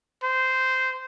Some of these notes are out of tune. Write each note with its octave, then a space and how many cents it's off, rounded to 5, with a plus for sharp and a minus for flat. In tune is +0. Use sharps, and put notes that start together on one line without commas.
C5 -15